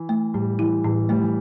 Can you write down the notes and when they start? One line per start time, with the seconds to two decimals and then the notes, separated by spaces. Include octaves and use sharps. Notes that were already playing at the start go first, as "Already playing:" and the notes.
Already playing: E3
0.09 A3
0.34 A2 G3
0.59 E3 E4
0.84 A2 E3
1.09 G3 A3
1.21 E3